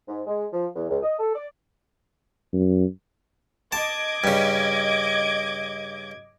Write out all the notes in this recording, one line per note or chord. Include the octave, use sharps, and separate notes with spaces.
G#2
G#3
F3
E2
C#2
D#5
A4
D5
F#2
D#5 A5 D6 G#6
G2 C#3